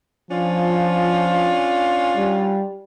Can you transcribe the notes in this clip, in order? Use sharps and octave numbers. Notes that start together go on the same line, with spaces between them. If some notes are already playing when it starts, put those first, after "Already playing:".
F3 C#4 D4 F4
G3